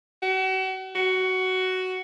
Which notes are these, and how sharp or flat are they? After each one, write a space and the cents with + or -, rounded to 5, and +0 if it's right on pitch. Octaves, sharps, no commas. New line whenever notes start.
F#4 +40
F#4 +10